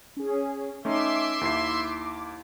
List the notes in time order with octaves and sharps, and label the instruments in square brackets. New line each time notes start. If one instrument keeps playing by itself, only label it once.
[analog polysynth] C#4 G#4
[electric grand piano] A3 C#4 D#4 [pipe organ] E5 C6 [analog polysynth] D6
[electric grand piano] D#2 E4 C7